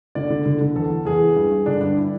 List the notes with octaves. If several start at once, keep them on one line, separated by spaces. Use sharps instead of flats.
D3 D5
D3
D3
D3
E2 A4
E2
E2 G#4
E3
G2
G2
D3 D4
G2 D4
E4